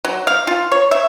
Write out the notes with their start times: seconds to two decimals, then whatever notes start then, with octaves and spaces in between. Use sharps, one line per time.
0.05 F#3
0.27 F5
0.47 F4
0.72 C#5
0.91 E5